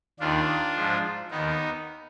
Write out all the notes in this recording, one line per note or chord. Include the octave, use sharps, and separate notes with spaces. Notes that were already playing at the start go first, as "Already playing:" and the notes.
D#2 D#3 D4 F4
G#2 F3
D#2 D#3 B3 D#4